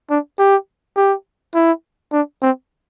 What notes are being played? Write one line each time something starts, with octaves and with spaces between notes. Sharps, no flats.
D4
G4
G4
E4
D4
C4